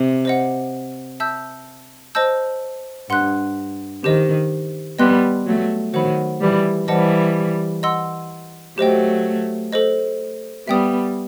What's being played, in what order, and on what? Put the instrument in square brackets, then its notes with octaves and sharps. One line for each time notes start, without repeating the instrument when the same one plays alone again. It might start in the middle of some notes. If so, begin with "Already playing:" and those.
Already playing: [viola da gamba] C3
[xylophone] C5 D#5 F#5
E5 A5 E6 G6
C5 D#5 A5 E6 G6
[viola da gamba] G2 [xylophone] F#5 C6 F#6
[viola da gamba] D#3 [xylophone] G4 C5 D#5
[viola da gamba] G3 B3 [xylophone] D#5 G5 C6 F#6
[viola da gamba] F#3 A3
[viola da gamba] D#3 F#3 [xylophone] C5 F#5 B5
[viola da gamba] E3 G3
[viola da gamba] E3 G3 [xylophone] C5 D#5 F#5 A5
[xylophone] D#5 F#5 C6 E6
[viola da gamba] F#3 A3 [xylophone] G4 C5 D#5 G5
[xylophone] A4 C5 D#5
[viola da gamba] G3 B3 [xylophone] E5 G5 D#6